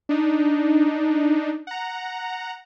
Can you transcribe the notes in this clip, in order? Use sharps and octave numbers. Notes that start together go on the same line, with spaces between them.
D4 D#4
F#5 A#5